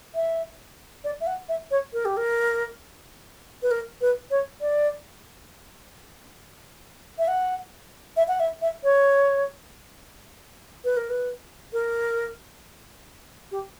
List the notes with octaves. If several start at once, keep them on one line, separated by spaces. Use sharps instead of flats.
E5
D5
E5
F#5
E5
C#5
A#4
G4
A#4
B4
A#4
B4
C#5
D5
E5
F#5
E5
F#5
E5
E5
C#5
B4
A#4
B4
A#4
G4